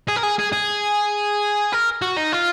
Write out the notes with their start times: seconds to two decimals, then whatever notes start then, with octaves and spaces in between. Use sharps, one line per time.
0.09 G#4
0.16 A#4
0.23 G#4
0.39 G#4
0.53 G#4
1.73 A#4
2.02 F#4
2.17 D#4
2.32 F4